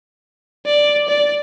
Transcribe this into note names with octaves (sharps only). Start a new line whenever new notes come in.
D5
D5